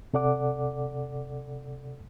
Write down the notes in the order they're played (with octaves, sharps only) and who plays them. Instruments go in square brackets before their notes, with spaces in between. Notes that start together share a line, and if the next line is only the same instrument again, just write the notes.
[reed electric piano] C3 A4 D5 F#5 D6